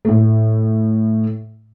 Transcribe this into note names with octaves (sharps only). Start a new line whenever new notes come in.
A2 A3